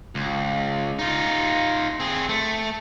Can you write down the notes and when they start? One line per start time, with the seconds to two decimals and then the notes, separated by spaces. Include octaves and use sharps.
0.15 C#2
0.99 D#4 F4
2.00 C4 G#4
2.29 A3